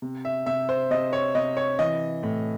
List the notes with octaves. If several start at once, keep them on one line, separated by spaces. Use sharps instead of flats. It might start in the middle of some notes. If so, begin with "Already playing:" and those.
C3
E5
C3 E5
C5
C3 D#5
C#5
C3 D#5
C#5
E3 D#5
A2